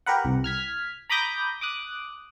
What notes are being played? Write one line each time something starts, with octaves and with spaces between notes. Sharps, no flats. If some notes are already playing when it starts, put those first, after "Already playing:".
G4 A#4 B4 F#5
C2
F6 G#6 B6
A#5 B5 D6 D#6 G6 A#6
D6 D#6 F#6